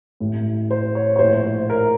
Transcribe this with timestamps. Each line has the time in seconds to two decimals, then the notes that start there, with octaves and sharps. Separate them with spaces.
0.20 A1 A2
0.71 C5
0.95 C#5
1.16 C#5
1.19 A#1 A2 C5
1.70 A#4